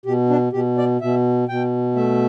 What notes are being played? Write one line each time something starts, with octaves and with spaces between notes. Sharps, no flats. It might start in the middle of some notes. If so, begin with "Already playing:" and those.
B2 G4
D4
B2 G4
D5
B2 E5
B2 G5
A3 E5